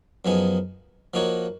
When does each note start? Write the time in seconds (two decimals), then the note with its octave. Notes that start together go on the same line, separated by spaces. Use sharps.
0.25 F#2 F3 B3 D#4 G#4
1.14 F3 A#3 D#4 F#4 C#5